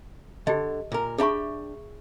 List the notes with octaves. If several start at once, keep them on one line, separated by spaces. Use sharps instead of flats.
D3 G4 D#5
A#2 A#4
D4 G4 G#4 E5 B5 C#6